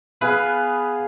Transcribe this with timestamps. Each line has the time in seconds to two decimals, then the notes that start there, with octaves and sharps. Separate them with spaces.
0.21 B3 G#4 B4 F5